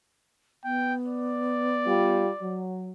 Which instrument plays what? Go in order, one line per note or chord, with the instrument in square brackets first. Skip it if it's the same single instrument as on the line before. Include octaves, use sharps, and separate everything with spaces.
[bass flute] B3 [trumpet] G5
[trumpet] D5
[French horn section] G3 F4
F#3